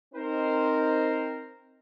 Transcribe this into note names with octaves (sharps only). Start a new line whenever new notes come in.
C4 D#4 A#4 C5